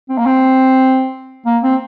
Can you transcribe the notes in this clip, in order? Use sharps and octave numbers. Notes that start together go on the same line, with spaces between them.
C4
A#3
C4
A#3
C4